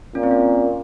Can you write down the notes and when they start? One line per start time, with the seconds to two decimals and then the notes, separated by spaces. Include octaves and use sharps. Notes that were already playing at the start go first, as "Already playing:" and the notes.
0.15 A#2 C#4
0.23 C4
0.31 C#4